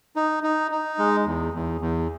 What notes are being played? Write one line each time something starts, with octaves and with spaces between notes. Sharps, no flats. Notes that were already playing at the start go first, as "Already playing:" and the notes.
D#4
D#4
D#4
G#3
E2
E2
E2